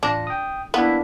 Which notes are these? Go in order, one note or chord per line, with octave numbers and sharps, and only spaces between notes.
A1 D4 F4 A#6
G5 D#6
A#3 B3 D4 E4